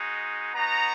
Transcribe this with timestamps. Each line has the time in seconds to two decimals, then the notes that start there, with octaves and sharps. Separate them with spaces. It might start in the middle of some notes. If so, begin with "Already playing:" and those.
Already playing: G#3 D#4 F#4
0.54 B3 D#4 F#4 A#5